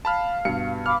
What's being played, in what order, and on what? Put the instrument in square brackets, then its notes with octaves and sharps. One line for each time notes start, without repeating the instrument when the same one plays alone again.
[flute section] F5 [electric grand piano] A5 B5 F6
[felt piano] G2 B2 [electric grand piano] C#7
[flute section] F5 B5 D6 [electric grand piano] F6